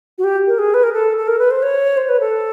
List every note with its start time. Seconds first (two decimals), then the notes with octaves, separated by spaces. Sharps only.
0.18 F#4
0.24 G4
0.47 A#4
0.59 G#4
0.74 B4
0.83 A#4
0.93 A4
1.17 A4
1.28 A#4
1.39 B4
1.51 C5
1.63 C#5
1.97 C5
2.09 B4
2.20 A4